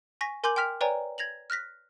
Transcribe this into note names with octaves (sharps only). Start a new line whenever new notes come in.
G#5 C#6 A#6 B6
A#4 G#5 C6 D6 G6 F#7
G5 C6 F6 B6 F7
B4 C#5 D5 G5 G#5 A#5
G#6 A#6 F7 F#7
F6 F#6 A#6 B6